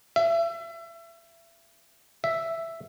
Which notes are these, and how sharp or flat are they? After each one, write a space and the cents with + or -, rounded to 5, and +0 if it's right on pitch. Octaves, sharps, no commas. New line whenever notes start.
E5 +30
E5 +5